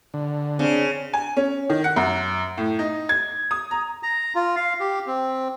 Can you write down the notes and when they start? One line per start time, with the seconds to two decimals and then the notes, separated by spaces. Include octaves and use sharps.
0.14 D3
0.59 C#3 C4 D4
1.13 G#5
1.37 C#4
1.70 D#3
1.84 F#5
1.96 F#2
2.58 A2
2.79 D#4
3.09 G#6
3.51 D#6
3.71 A#5
4.03 A#5
4.35 F4
4.56 F5
4.80 G4
5.07 C4